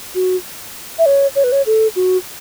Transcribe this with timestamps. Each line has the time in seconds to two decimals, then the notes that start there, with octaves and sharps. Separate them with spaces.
0.15 F#4
0.99 E5
1.06 C#5
1.36 C#5
1.44 B4
1.52 C#5
1.66 A4
1.96 F#4